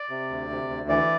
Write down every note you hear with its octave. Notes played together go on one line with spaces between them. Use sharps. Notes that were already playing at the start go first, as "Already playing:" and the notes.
Already playing: D5
C3
D2
C3
D2
E3 D5